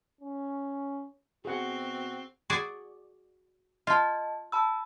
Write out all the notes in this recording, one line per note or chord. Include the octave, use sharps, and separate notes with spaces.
C#4
B2 C4 F#4 G#4 F#5
F#4 G#4 D5
F4 D#5 A5
A5 B5 E6